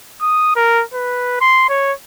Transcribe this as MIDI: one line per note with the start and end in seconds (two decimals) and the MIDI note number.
0.22 0.55 87
0.56 0.83 70
0.94 1.36 71
1.41 1.66 84
1.69 1.92 73